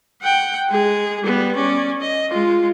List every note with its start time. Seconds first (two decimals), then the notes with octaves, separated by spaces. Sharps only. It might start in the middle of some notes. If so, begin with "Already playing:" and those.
0.22 F#5 G5
0.70 G#3 G#4
1.23 G3 B3
1.55 C#4 D5
2.01 D#5
2.30 G#3 F4